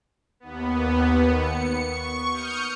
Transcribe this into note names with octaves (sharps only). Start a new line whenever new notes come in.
D#2 B3
C#7
C#6
D#6 F6 G6 C#7